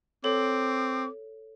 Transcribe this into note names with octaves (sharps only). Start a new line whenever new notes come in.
C4 A4 C#5 D6